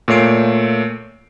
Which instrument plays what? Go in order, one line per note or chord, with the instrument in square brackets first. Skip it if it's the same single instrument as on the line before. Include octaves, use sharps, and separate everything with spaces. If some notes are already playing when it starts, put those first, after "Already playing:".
[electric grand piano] A#2 A3 C#5 C7 D7